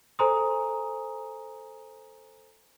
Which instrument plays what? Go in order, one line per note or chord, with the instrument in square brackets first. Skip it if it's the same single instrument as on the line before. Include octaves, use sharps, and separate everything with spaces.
[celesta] A4 C5 G#5 A#5 C6 D#6